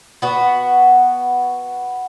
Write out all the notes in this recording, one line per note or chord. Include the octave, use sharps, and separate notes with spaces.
B3 F#4